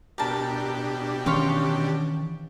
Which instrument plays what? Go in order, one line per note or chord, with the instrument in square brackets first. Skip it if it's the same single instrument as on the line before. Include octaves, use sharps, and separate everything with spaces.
[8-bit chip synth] B2 D4 G4 [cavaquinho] A#4 A5
[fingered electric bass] D#3 E3 C#4 [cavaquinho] C#5 F5 C6